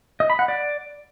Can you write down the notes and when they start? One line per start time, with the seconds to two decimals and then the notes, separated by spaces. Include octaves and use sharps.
0.20 D#5
0.30 B5
0.39 F#5
0.48 D5